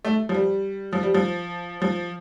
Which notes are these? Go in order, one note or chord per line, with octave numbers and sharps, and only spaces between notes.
A3
F3
G3
F3
G3
F3
F3